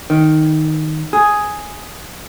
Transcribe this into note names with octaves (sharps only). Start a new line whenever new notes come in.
D#3
G#4